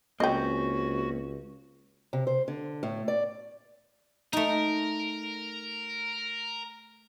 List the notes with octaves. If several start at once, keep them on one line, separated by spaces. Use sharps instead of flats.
C#2 A#3 C4 C#4 F#4 D#5 G5
C3
C5
D3
A2
D5
A3 D#4 A#4